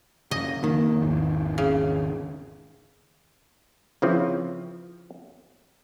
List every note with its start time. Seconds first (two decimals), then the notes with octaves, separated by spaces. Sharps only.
0.31 F#2 C#3 D#5
0.64 F2 D#3 A#3
1.01 G#1 E2 E3
1.58 C#3
4.02 C#3 E3 F3 C4